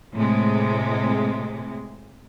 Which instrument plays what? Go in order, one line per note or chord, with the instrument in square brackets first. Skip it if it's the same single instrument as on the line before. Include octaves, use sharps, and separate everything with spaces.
[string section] A2 C3 G#3